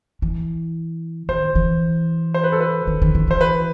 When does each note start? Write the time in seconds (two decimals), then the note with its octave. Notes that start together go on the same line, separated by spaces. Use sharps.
0.22 E3
1.29 D#3 C5
1.55 E3
2.34 C5
2.44 B4
2.52 A4
2.61 B4
2.87 D#3
3.02 D#3
3.15 D#3
3.28 E3 C5
3.41 B4